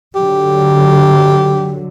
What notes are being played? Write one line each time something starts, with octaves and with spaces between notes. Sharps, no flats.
D3 F#3 G4